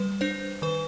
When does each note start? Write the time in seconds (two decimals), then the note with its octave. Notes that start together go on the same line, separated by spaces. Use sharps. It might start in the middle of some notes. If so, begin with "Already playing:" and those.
Already playing: G3 B4
0.21 D4 C5
0.62 D#3 B4